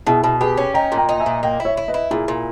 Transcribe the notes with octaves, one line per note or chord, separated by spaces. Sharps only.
B2 E4 G#4
B2
G4 G#4 B4
C#4
D#4 G5 A#5
A#2
G5 A#5
D#4
E5 G#5
A#2
A#3 D#5 G5
E4
C#5 E5
E4
B4 D#5
E4
A#2 E4 G#4
A#2